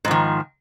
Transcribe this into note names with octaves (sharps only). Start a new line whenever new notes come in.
G#2 D#3 F3